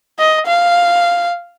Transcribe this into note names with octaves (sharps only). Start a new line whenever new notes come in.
D#5
F5